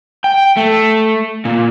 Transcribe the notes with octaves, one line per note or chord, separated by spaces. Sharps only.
G5
A3
A#2